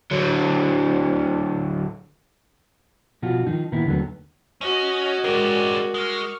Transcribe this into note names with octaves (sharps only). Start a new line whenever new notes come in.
D3 F#3
B2 F3 F4 F#4
D#3 F3 D#4
A#2 D#3 B3 E4
D#2 D3 D#3 F#3 A3 B3
C#4 F#4 D#5
G#3 C#4 G4 A#4 D5 D6
G#3 C#6 F6